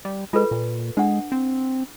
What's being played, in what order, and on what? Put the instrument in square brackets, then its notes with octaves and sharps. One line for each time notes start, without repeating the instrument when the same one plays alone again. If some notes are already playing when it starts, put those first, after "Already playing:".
[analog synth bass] G3
[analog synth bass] G#3 [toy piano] F4 A4 B4
[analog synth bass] A#2
[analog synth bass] G#3 [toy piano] D4 F#5
[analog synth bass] C4